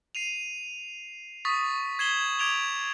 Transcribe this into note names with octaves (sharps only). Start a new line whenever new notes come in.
C7 D#7 F7
C#6 D#6 A6 B6
G#6 C7 E7 F#7 G7
D6 G#6 D7 F7 G7